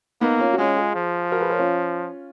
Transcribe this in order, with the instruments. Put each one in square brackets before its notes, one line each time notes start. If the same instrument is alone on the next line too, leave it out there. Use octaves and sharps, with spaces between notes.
[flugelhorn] A#3 [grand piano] B3 D#4
[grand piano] C#4 F4
F#4
[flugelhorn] G#3 [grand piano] C#4 F4
[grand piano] F4 G#4
[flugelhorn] F3
[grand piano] F#4 A#4
G#4 B4
A#4 C#5
C#4 F4